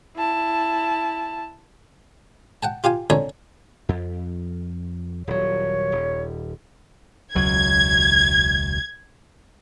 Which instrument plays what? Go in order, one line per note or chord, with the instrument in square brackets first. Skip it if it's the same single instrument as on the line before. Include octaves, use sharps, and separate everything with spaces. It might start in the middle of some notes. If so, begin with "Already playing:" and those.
[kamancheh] E4 A5
[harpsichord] F#5 G5 A5
F4 G4 F5 G#5
C2 D3 D4 C#5 G#5 A#5
[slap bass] F2
[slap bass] D#1 F#3 [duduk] C#5
[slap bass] D#1
[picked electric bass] E1 C#2 F#3 [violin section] G#6